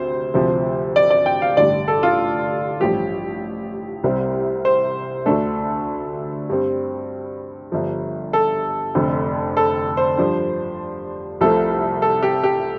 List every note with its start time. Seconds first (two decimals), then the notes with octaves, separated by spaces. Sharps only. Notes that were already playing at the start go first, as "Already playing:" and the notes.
Already playing: D2 C3 C5
0.34 D2 C3 F3 C4
0.96 D5
1.10 D5
1.26 G5
1.42 F5
1.57 A1 G2 D3 D5
1.88 A4
2.03 F4
2.80 A1 G2 F3 G4
4.04 C2 C3 G3 C4
4.65 C5
5.26 D2 D3 A3 D4 A4
6.49 G2 G3 C4
7.72 G1 G2 F3
8.33 A4
8.95 F1 F2 D3
9.57 A4
9.97 C5
10.18 G2 F3 D4
11.41 C2 C3 F3 A3 A4
12.02 A4
12.23 G4
12.43 G4